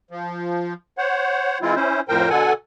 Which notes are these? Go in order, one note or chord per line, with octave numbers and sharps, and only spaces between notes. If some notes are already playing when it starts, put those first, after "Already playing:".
F3
C5 C#5 F#5
E3 G#3 C4 E4 F4
C#4 E4 C5
F2 A2 F3 A#4 C5 G5
B2 D3 A4 F#5 G#5